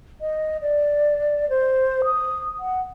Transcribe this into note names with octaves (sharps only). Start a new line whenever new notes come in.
D#5
D5
C5
D#6
F#5